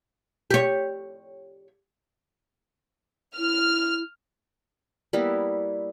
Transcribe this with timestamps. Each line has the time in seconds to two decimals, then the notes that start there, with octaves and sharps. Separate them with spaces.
0.51 G4 C#5
3.38 E4 F6
5.13 G3 A#3 B3 E4